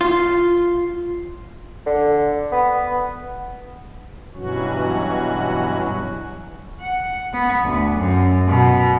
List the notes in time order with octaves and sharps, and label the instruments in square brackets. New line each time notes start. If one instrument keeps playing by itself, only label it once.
[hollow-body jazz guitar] F4
[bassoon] D3
B3
[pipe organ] G2 B2 E3 F#3 C#4 F#4
[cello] F#5
B3
D2
F#2
B2